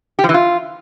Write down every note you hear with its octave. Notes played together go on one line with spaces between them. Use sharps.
G4
F3
E3
F4